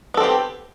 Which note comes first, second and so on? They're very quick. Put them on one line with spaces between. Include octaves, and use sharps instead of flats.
B3 A4 C4 G4